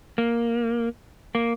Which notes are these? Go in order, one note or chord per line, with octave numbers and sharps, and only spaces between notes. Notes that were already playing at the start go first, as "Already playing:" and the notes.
A#3
A#3